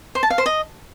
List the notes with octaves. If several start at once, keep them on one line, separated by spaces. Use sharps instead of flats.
C5
A5
F5
C5
D#5